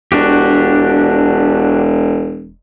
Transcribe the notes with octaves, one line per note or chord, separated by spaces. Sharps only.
E1 D4 F#4 G4